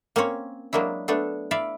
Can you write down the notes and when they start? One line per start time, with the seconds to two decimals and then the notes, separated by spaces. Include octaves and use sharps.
0.16 A#3 C4 C#4 C#5
0.73 F#3 G#3 A#3 D4 E4
1.08 A3 B3 D4 A4
1.51 E4 D5 E5 F5